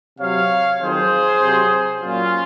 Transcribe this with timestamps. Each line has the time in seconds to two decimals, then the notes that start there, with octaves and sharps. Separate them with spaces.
0.18 C3 F#3 C#5 F5
0.79 F2 D#3 F#3 G#4 C5
1.40 C3 F#3
2.01 A#2 F#3 C#4 F4